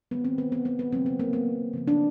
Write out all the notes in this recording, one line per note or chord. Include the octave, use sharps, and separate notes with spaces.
D#3 G#3 B3
C4
B3
B3
B3
B3
C#3 F#3 A#3 C4
B3
A#3
B3
C#3 F3 A#3
D4